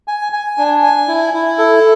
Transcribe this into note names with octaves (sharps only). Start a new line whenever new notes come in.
G#5
G#5
D4
G#5
E4
E4
A4